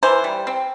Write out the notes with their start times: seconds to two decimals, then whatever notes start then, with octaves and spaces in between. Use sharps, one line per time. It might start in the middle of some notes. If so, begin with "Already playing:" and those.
0.03 E3 C5
0.24 G3
0.47 C4